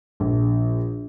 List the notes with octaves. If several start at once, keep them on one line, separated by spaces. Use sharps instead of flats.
A#1